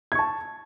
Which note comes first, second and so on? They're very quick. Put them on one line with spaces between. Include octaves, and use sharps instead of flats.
G#6 C#6 A5